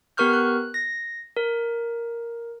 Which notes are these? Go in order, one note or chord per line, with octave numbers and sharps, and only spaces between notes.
B3 G4 A#4 C#6 F6 G6
F#6
A#6
A#4